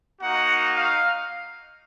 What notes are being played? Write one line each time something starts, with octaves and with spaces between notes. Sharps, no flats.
A#3 D#4 F#4 F#5
F5